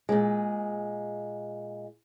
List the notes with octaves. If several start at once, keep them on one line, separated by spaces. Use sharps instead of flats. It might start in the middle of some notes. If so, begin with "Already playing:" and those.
A#2 G#3